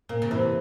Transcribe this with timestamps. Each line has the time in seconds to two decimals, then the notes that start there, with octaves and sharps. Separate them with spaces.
0.09 A#2 A#3
0.22 C#3
0.31 C3 E3